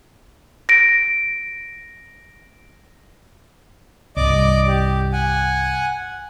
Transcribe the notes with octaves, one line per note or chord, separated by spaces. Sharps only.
A#6 D7
C2 G2 D5 D#5 D6
G4
F#5 G#5